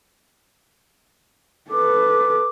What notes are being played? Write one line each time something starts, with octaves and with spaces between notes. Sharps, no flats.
A4 B4 D6